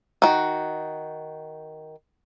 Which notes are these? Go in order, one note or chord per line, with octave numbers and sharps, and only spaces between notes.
D#3 F#4